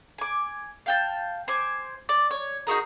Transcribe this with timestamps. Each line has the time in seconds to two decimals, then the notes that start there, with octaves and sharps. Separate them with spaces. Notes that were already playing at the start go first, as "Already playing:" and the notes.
0.18 G#5 D6
0.86 F5 G5 A5
1.48 C5 G#5 D6
2.09 D5
2.31 C#5
2.67 D#4 F#4 G#4 A#4